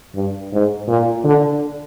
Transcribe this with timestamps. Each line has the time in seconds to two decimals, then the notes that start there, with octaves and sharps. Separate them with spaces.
0.15 G2
0.53 G#2
0.88 A#2
1.25 D3